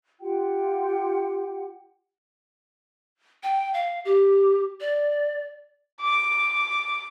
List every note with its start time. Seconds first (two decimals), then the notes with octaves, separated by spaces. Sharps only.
0.20 F4 G4 F#5 G5
3.43 G5
3.74 F5
4.05 G4
4.81 D5
6.01 D6